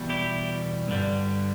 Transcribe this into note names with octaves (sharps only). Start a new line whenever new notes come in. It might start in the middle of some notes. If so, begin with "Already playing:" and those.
Already playing: E2 B2 G3
E4 G4
G2 D3 G3